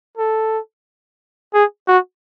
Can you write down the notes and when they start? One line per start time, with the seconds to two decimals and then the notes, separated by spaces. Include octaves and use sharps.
0.17 A4
1.54 G#4
1.88 F#4